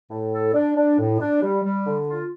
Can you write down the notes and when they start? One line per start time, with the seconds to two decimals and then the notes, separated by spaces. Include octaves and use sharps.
0.10 A2
0.32 A4
0.54 D4
0.76 D4
0.99 A2
1.20 D4
1.42 G3
1.64 G3
1.86 D3
2.08 F4